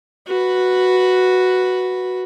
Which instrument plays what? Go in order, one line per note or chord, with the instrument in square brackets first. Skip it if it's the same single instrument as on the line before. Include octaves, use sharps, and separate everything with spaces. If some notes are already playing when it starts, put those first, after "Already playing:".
[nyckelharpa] F#4 B4